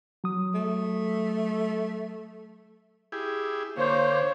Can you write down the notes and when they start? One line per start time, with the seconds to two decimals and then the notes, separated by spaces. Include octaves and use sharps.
0.24 F#3 D#6
0.54 A3
3.12 E4 G4 G#4
3.77 D3 A#3 C5 C#5